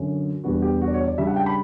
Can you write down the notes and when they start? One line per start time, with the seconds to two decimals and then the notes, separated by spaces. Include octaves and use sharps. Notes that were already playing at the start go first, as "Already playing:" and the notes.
Already playing: F#2 D3 F#3 C#4
0.44 E2 B2 G3 B3 D4 F#4
0.62 G4
0.82 F#4
0.88 D5
0.94 C#5
1.06 D5
1.18 C#3 G3 D4 E5
1.27 F#5
1.36 G5
1.46 B5